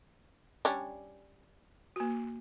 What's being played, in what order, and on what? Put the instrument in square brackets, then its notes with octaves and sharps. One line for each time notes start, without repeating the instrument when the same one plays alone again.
[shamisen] G3 C#4 D4
[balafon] A#3 F#4